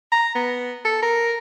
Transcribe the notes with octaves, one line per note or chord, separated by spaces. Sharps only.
A#5
B3
A4
A#4